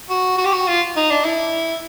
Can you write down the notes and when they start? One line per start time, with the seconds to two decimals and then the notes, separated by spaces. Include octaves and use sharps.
0.10 F#4
0.38 F#4
0.45 G4
0.53 F#4
0.68 F4
0.96 D#4
1.10 D4
1.25 E4